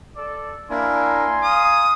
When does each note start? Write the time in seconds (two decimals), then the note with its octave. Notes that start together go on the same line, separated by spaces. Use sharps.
0.16 A4 D5
0.70 A#3 D4 E4 G#5 A#5 C6
1.43 F5 D#6